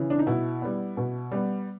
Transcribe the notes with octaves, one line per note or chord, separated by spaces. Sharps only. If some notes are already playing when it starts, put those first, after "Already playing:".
Already playing: C#3 E3
D4
D#4
B2 E4
G3 B3
B2
G3 B3